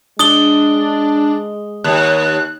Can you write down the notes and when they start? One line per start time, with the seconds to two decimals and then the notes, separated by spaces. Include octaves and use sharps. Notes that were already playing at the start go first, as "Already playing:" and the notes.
0.19 G#3 D4 D#6 G7
1.84 D#2 F#6